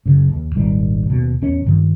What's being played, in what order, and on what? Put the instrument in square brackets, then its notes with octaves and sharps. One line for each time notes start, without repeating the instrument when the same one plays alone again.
[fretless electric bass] F#2 C#3
D#2
D#1 G#1 D#3 G3
D#2 B2
E2 C#4
G2 D#3